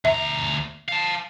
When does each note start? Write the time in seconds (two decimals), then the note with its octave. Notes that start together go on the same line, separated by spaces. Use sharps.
0.05 D2 E5 A#5
0.89 F5 A5